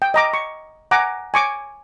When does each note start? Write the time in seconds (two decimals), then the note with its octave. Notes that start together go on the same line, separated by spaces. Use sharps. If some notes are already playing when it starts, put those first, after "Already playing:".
0.02 G5
0.14 D#5 A#5 D6
0.34 C#6
0.91 F#5 G#5 A#5 D6
1.34 G#5 C#6 D6